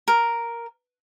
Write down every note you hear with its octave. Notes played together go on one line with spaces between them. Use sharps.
A#4